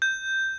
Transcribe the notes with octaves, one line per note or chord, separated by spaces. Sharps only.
G6